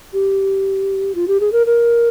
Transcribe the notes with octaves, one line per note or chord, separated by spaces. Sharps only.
G4
F4
G4
G#4
A#4
A#4